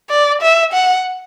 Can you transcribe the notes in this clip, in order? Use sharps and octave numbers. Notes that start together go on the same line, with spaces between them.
D5
E5
F#5